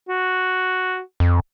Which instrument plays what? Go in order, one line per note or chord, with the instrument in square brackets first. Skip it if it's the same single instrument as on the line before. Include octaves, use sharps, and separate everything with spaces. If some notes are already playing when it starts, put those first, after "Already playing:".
[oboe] F#4
[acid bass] F2